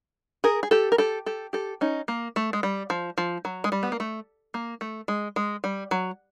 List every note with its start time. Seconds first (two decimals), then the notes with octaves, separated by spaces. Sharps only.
0.44 G#4 A#4
0.63 G#4
0.71 G4 A4
0.92 A#4
0.98 G4 A4
1.26 G4 A4
1.53 G4 A4
1.81 C#4 D#4
2.08 A#3
2.36 A3
2.53 G#3
2.63 G3
2.90 F3
3.18 F3
3.45 F#3
3.64 G#3
3.72 G3
3.83 B3
3.92 A#3
4.00 A3
4.54 A#3
4.81 A3
5.08 G#3
5.36 G#3
5.64 G3
5.91 F#3